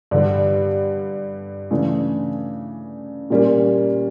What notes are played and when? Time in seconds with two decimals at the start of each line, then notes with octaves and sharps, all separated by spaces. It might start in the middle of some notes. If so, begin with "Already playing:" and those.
0.11 G2 D3 G3
1.71 C#3 E3 A3 D4
3.30 A#2 G3 A#3 C#4